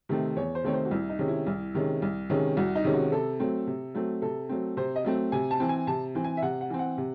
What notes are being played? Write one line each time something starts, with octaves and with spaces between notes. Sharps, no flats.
C3 D#3 A3 C4
E2 C#5
C5
C3 D#3 A3 C4 C#5
C5
F#4
C2 E4
D#4
C3 D#3 G#3 C#4
E4
C2
C3 D#3 G#3 C#4
C2
C3 D#3 G#3 C#4
C2 F#4
D#4
C3 D#3 G#3 C#4
F#4
C3 A4
F#3 A3 C4
C3
F#3 A3 C4
C3 A4
F#3 A3 C4
C3 C5
D#5
F#3 A3 C4
C3 G#5
A5
E3 C4
G#5
C3 A5
E3 C4
G#5
E5
C3 F#5
F#5
E3 C4
F#5
C3